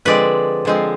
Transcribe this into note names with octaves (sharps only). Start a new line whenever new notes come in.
D3 F3 G#3 C4 B4 D5
D3 F3 G#3 C4